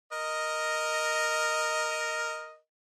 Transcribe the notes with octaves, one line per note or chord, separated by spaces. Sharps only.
A#4 D#5